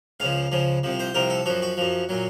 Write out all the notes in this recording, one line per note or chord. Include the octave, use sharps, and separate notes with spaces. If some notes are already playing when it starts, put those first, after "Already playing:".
C#2 C#3 F3 F5
C#2 C#3 F3
C2 C3 F3
C5
C2 C3 F3 A#4
A4
F#2 F3 F#4
F#4
F#2 F3
A#2 F#3